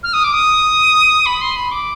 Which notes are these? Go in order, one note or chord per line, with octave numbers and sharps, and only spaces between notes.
F6
D#6
D6
D#6
B5
C6
B5
D6